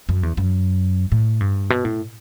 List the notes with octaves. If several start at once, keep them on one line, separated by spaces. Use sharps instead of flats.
F#2
E2
F#2
A2
G2
B2
A2